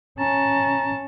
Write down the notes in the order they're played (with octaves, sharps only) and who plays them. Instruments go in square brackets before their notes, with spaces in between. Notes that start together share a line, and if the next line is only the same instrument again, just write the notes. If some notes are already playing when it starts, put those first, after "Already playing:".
[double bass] C#4 [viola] A5 [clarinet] A#5